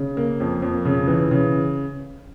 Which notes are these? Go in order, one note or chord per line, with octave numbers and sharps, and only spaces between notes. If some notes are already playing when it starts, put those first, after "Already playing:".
Already playing: C#3
A#3
F2
F2
C#3
E3
C#3